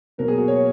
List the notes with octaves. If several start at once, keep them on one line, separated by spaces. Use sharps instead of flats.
B2 F#3 A#3 A#4
G#4
F#4
C#5